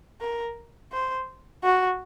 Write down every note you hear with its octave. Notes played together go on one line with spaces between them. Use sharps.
A#4
C5
F#4